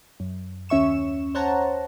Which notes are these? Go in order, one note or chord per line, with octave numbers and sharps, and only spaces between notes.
F#2
D#2 C#4 E5 C#6 E7
C5 C#5 F#5 A5 A#5